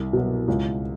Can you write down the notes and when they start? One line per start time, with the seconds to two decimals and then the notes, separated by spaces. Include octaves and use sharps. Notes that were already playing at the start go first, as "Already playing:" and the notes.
Already playing: C2
0.13 B2 F#3
0.48 C#2